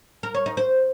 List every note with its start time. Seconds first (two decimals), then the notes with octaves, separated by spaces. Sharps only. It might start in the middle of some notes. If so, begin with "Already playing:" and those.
0.23 A#4
0.35 C#5
0.46 D#4
0.57 C5